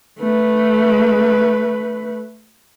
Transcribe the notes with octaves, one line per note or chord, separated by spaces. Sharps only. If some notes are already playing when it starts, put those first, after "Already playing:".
A3 B4